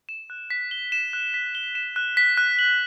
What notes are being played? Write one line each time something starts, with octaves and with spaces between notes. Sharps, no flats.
E7
F#6
B6
G7
E7
F#6
B6
G7
E7
F#6
B6
F#6
F#7